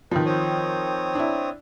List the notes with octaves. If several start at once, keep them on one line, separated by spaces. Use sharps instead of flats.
D#3 F3 B4
C4 C#5 D#6
D4 E4